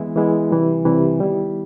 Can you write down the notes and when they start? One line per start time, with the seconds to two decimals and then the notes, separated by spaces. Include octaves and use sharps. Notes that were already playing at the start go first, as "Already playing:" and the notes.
Already playing: E3 G#3 B3 E4
0.16 E3 G#3 B3 E4
0.51 C3 E3 G3
0.85 C3 E3 G3
1.19 D#3 G3 B3 E4